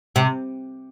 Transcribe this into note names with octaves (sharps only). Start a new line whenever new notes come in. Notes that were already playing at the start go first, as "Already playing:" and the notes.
C3